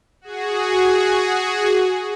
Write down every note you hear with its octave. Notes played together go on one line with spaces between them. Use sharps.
F#4 G#4